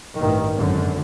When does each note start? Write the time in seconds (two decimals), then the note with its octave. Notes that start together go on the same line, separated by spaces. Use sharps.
0.18 A1 G2 D#3
0.56 G#1 F#2 D3